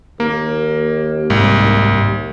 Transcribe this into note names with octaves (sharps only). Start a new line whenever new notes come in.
D#2 A#3
C2 G#2